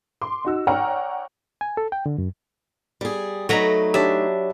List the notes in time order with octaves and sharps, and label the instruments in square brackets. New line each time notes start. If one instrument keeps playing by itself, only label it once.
[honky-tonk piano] C6 D6
D#4 F#4 E6
C#5 D5 F#5 G5 A#5 F6
[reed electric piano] G#5
A4
G5
D3
F#2
[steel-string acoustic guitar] G3 G#4
[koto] F#3 B4 A#5 [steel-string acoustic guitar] A3 D#4
[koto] D4 E5 [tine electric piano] G4 C#5